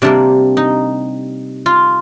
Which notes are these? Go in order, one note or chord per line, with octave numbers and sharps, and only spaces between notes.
C3 G3 A#3 D4
D#4
F4